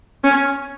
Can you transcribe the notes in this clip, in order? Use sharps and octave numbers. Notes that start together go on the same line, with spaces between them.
C#4